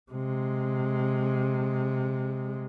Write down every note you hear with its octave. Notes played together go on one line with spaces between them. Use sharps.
C3 G#3